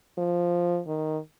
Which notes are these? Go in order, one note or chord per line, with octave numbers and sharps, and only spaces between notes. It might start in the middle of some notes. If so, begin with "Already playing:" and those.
F3
D#3